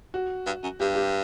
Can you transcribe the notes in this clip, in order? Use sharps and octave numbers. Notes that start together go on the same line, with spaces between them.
F#4
G2
F#2
G2 G4
G4